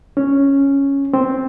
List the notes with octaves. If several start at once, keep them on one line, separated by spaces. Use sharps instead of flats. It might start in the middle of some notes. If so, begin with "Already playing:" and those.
C#4
C4